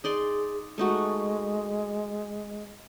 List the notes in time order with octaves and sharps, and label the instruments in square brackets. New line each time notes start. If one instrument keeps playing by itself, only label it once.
[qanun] D#4 D5 C6 [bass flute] G#4
[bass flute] G#3 [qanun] A3 D#4 F#4